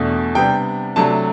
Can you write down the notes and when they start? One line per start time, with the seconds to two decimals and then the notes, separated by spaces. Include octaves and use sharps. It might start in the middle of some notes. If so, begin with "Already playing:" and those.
Already playing: E2 B2 A3 D4
0.35 C3 G3 B3 D4 G5
0.96 C3 F#3 A3 D4 A5